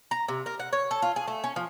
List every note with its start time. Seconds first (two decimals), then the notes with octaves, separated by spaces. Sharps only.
0.11 A#5
0.28 C3
0.46 A#4
0.60 F#5
0.73 C#5
0.91 A4
1.02 F4
1.16 G#4
1.28 A3
1.44 C#4
1.56 F3